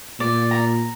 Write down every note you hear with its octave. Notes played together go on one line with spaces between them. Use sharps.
A#2 D5
A#5